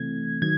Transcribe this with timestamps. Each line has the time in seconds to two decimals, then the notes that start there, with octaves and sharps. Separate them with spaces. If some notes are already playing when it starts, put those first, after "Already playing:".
Already playing: C3 E3 A3 C4 G#6
0.42 D#3 F#3 G#6